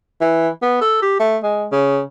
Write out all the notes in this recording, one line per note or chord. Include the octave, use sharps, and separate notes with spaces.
E3
B3
A4
G4
A3
G#3
C#3